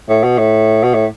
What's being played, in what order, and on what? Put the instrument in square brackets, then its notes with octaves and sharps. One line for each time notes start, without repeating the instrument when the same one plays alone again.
[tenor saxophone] A2
B2
A2
B2
A2